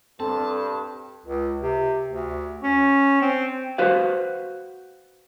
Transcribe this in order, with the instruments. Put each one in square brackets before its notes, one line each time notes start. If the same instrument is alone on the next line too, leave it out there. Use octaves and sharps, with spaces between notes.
[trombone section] G2 [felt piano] C4 [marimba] A4 [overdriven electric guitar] A5
[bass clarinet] C#2
C3
D2
C#4
C4
[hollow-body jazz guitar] F#4 B4 C5 F5